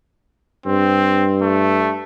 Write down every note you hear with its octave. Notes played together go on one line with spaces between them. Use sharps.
G2 C4
A3